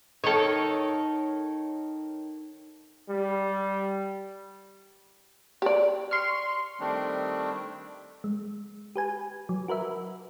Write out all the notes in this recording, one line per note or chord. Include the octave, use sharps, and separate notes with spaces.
D#3 A4 C#5
G3
G4 D5
C6 C#6 F6
D#3 G3 A3 C4 D4
G#3
G4 B4 G#5
F#3
F#4 A#4 B4 E5